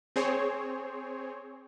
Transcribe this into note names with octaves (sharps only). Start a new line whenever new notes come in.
C4 G#4 C5 C#5